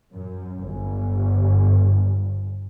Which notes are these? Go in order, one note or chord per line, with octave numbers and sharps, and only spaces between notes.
F#2
G1